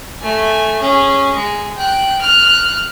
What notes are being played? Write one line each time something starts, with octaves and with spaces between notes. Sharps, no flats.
A3 G#5
C#4 G#4
G#3
G5 F#6
F6 F#6